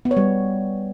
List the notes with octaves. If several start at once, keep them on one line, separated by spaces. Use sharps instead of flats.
B3
C#5
G3